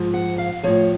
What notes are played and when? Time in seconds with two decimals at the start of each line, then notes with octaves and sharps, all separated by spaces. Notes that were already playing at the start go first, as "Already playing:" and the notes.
Already playing: G#2 F3
0.14 F#5
0.38 F5
0.63 A2 F3 C#5